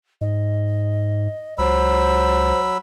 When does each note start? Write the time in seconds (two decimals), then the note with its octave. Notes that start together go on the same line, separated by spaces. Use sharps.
0.21 G#2 D#5
1.58 C#2 F#3 C5 B5 E6